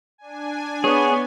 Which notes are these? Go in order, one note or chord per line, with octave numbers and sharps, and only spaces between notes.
D4 G#5
B3 G#4 C#5